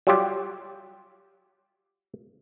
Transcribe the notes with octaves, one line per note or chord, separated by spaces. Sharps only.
F#3 G3 F4 G4